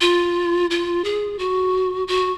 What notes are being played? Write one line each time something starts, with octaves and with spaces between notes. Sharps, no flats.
F4
F4
G#4
F#4
F#4